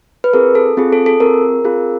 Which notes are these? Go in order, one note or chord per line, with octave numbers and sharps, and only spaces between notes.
B4
C4 F4 G#4 A#4
A4
C4 F4 G#4
A4
A4
C4 F4 G#4 A#4
C4 F4 G#4